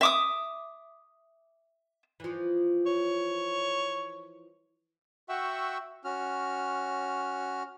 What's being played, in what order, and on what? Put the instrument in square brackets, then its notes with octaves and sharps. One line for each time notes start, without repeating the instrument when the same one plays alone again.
[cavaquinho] E5 D6 D#6
[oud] E3 F3
[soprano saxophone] C#5
[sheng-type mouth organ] F#4 E5 F#5 G5 C#6 E6
C#4 F#4 F6